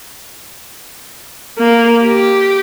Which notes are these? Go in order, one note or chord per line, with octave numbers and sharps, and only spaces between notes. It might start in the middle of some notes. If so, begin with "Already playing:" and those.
A#3
G4